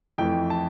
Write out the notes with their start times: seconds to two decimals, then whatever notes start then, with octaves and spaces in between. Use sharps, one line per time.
0.18 F2 E3 A3 E4 G5
0.50 A5